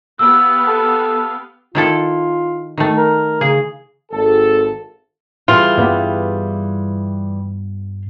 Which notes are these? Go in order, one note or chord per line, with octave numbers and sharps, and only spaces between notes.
B3 G4 F5 E6
A4
D#3 E4 F4 A4
D#3 A3
A#4
C#3 G#4
G#1 A4
E3 G3 F4 G#4
G2 B3 G4